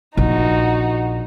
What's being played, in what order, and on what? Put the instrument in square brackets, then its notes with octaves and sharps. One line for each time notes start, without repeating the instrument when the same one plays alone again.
[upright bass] A#1 [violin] D#4 F#4